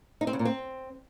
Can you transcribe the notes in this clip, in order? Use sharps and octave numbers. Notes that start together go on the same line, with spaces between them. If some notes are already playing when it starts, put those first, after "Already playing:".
D#4
C4
C#3
A#2
C4